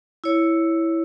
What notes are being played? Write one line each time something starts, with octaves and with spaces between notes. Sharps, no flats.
E4 C#5